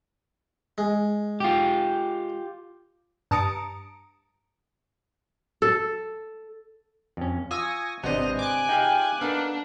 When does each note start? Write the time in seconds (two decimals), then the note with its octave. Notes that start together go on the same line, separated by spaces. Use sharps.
0.78 G#3
1.40 F4 G4
3.31 G2 A5 A#5 D#6 C#7 D7
5.62 A4
7.17 F2 C#4
7.51 F4 G#5 C#6 D#6 E6 A#6
8.03 G#1 C3 B3 D4 C5 D#5 F7
8.39 G#5 D6 F#6
8.69 D#4 F4 G4 G#4 G5
9.21 A#3 B3 D4 D#4 A4